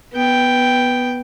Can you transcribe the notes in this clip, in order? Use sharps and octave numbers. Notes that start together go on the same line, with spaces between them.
B3 G5